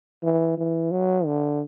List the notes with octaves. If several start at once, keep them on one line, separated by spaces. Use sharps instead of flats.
E3
E3
F#3
D3